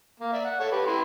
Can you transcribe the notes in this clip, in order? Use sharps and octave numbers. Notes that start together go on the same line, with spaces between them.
A#3
D5 E5
F#5
A4 C#5
G4 B4
E4 B4 C6